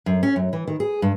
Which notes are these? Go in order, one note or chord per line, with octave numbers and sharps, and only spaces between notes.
F#2
C#4
F#2
E3
D#3
G#4
G2